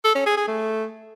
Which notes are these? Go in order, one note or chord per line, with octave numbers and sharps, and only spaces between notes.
A4
C#4
G#4
G#4
A3